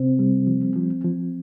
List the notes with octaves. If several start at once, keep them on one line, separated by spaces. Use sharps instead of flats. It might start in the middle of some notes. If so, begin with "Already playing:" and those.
Already playing: C3 C4
G3
F3
F3
F3